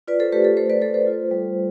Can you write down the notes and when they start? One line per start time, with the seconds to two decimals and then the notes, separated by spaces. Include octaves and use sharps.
0.08 F4 B4 D5
0.20 A4 C5
0.32 A3 G4 B4
0.44 A4
0.57 A3 A4 C5
0.70 B4 D5
0.81 A3 A4 C5
0.94 A4 C5
1.07 F4
1.31 G3